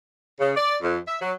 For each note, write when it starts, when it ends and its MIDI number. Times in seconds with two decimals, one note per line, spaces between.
0.40 0.52 49
0.56 0.76 74
0.82 0.99 41
1.08 1.17 76
1.21 1.32 54